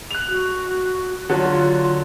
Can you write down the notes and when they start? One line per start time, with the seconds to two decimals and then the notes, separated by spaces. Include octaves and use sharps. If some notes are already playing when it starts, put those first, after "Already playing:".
0.11 F#6 F7
0.29 F#4
1.29 D3 F#3 F4